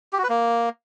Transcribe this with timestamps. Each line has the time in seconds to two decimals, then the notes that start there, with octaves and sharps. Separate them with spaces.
0.13 G4
0.18 F#4
0.24 B4
0.29 A#3